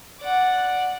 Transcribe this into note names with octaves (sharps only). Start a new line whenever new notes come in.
D5 F#5